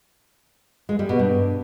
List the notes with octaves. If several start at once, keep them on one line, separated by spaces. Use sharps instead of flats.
G#3
G3
B2
G2